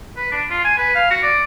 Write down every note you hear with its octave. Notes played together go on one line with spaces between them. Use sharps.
B4
D4
F4
G#5
B4
F5
F#4
D5